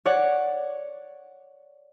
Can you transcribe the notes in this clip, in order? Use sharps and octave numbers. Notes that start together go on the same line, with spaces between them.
C#5 D5 F#5